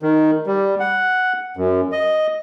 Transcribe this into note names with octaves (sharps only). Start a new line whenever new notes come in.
D#3
G3
F#5
F#2
D#5